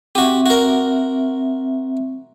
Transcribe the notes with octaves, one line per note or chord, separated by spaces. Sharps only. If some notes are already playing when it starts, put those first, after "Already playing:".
C4 F#4 G4 E5
F#4 A#4